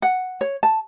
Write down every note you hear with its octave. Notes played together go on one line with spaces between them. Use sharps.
F#5
C#5
A5